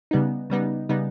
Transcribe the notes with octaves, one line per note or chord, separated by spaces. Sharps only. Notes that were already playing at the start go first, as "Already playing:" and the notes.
C#3 G3 B3 D#4
C#3 G3 B3 D#4
C#3 G3 B3 D#4